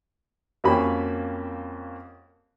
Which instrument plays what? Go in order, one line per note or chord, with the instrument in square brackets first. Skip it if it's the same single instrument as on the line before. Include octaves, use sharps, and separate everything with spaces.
[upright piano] F2 A#3 C#4 F#4 G4 B5